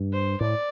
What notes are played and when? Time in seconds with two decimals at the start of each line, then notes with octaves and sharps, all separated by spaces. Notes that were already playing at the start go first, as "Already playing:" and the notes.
Already playing: G2
0.13 C5
0.41 A2 D5